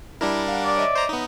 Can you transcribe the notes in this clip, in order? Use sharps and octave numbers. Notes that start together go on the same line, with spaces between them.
G3 D4 E4 A#4
F5 F#5
D5
C#5 D#5 E5
C5 A#5
B3 D#4